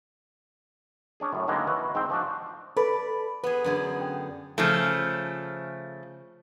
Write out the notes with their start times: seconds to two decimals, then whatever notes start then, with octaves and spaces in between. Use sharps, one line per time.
1.20 C#4 D4 G#4
1.33 F#2 A2
1.48 D3 D#3 F#3 G#3 A#3 B3
1.67 E4 F#4 B4
1.95 G#2 C4 C5 G5
2.10 F3 D4 F#4
2.77 A4 B4 D5 B5
3.44 B3 G#4 B4
3.64 F#2 D3 G#4
4.01 G5
4.58 C#3 F3 A3